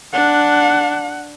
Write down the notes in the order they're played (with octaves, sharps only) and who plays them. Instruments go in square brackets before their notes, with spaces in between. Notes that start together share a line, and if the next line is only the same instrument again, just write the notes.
[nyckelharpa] D4 [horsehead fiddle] F#5